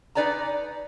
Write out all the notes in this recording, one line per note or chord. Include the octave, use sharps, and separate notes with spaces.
D#4 B4 D5 G#5 A#5